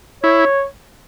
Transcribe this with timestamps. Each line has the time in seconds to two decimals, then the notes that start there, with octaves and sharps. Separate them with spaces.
0.23 E4 C#5